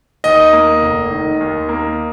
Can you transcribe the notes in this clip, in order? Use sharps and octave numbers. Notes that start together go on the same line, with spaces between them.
D#2 D#5
A#3
F1
D#3
D#2
A#3